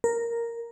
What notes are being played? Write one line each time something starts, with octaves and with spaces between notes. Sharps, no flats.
A#4